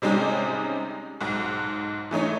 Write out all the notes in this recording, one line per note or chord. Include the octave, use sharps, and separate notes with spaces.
C3 G3 G#3 C#4 D#4 G4
B1 G#2
E3 A3 D#4 C#5